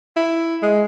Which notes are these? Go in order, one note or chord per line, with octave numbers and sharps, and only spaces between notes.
E4
G#3